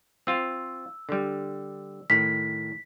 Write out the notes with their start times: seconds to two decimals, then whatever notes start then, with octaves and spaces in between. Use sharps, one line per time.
0.27 C4 F4 E6
1.09 D3 G3
2.10 A2 D#3 B6